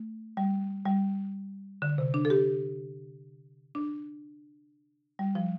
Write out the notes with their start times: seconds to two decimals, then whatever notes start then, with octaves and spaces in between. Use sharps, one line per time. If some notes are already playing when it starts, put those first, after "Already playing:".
Already playing: A3
0.37 G3
0.85 G3
1.82 D3
1.98 C3
2.14 D4
2.25 A4
2.30 G4
3.75 D4
5.19 G3
5.35 F3